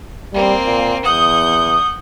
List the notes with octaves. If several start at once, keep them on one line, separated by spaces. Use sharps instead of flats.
G3 A#3 C4
A#2
E2 F#5 D#6 G6